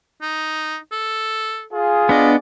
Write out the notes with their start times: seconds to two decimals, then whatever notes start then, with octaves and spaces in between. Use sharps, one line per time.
0.22 D#4
0.92 A4
1.73 F4 G#4
2.09 B3 D4 D5 D#5